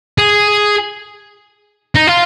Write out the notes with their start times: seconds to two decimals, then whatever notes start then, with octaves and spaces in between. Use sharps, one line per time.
0.18 G#4
1.95 D#4
2.07 F4